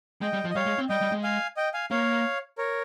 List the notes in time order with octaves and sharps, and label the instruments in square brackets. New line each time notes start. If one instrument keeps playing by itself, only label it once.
[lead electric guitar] G#3 [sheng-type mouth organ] D#5 G5
[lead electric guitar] G3
F3
[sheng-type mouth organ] D#5
[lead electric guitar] G3 [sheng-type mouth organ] C#5 F5
[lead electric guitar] G#3
C4
[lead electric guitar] G3 [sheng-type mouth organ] D#5 G5
[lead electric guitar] G3
G#3
[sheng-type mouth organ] F5 G#5
D#5 G5
F5 G#5
[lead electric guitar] A#3 [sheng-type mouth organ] C#5 F5
[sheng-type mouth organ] A#4 C#5